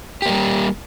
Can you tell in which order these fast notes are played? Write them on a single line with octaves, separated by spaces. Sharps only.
G4 A#3 G3